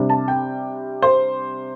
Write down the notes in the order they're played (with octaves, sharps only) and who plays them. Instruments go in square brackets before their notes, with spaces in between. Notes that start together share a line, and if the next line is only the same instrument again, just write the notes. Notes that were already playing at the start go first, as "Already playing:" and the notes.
Already playing: [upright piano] C3 G3 D4
A5
G5
C5